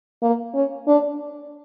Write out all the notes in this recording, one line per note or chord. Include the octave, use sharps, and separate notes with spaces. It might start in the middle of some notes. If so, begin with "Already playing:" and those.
A#3
C#4
D4